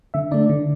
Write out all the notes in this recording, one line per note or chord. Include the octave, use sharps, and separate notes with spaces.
D3 E5
A3 D4 D5
D3